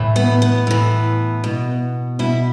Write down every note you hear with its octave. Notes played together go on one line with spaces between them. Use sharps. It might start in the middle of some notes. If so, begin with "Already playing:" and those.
Already playing: A2 E3
B3
B3
A2 E3
B2
B2 E4